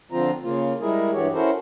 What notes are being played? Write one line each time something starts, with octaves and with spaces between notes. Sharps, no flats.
D3 F3 C4 F4 A#5
C#3 A#3 F4
G3 G#3 E4 G#4 A#4
G2 E3 F#4 G4 C#5
C#4 E4 F#4 A4 A#4 C5